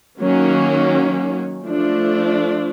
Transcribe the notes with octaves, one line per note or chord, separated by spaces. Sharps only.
D#3 F#3 A#3 C#4
F3 A3 D4